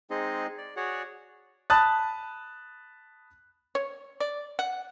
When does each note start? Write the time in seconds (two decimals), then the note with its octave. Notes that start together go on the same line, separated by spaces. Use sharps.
0.10 G#3 C4 D#4 G#4 D#5
0.58 D5
0.76 F#4 G#4 C#5 D5 F#5
1.70 A5 B5 D#6 F#6 A6
3.75 C#5
4.20 D5
4.59 F#5